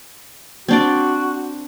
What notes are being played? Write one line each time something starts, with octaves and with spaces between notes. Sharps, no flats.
C4 D4 F#4 D5